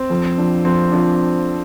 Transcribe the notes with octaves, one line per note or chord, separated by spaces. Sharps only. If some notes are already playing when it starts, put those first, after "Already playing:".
Already playing: C4
F2
F3 D4
F2 C4
F3 D4